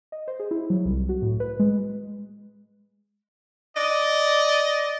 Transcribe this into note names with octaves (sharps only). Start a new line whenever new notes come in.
D#5
C5
G#4
E4
F#3
C2
F#4
A2
B4
G#3
D5 D#5